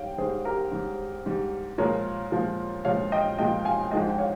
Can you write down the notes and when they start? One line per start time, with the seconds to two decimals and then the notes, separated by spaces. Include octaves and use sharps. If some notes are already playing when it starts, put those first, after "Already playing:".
Already playing: G#2 G3 C#5 F5 G5
0.18 G#2 G3 G#4 C5
0.45 G4 A#4
0.71 G#2 G3
1.26 G#2 G3
1.78 A#2 F3 G#3 A#4 C#5
2.32 A#2 F3 G#3
2.85 A#2 F3 G#3 C#5 F5
3.12 D#5 G5
3.38 A#2 F3 G#3 D#5 G5
3.65 F5 G#5
3.91 G#2 F3 G#3 D#5 G5
4.10 G5
4.18 C#5 F5